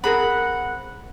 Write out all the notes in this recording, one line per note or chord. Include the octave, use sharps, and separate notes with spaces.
C4 G#4 A#4 F#5 B5